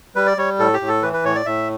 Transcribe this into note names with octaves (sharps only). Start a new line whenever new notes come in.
G3 B4
D5
G3 C#5
A2 A4
G4
A2
A4
E3 B4
B4
A2 C#5
D5
A2 E5